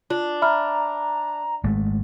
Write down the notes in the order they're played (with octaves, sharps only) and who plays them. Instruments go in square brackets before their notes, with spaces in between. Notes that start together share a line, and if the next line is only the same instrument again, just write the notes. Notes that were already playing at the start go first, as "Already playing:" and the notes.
[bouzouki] D4 [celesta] F4
[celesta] E5 B5 F6 [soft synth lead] A#5
[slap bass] G#1 G#3 A3